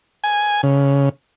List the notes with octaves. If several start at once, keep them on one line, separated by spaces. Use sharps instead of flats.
G#5
C#3